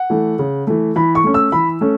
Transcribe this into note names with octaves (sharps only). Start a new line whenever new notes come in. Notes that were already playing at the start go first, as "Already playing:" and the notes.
Already playing: F#5
E3 A3
C#3
E3 A3
E3 B5
C#6
A3 C#4
E6
E3 B5
A3 C#4